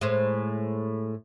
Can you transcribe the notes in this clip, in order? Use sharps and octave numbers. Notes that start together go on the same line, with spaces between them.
A2 G#3 C5